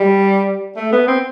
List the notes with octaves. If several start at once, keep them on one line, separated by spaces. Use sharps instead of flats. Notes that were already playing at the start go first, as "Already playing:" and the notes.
Already playing: G3
A3
B3
C4